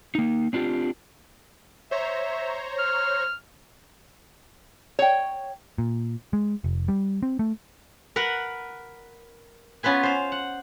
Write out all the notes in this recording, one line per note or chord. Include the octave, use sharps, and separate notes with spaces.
A#3 D#4
C4 D4 F4 G4
C5 C#5 E5 A#5
F6
C#5 G5
A#2
G#3
F1
G3
C4
A3
A#4 B4 F#5
B3 C#4 F4 B4 G#5
C5 F5
F#5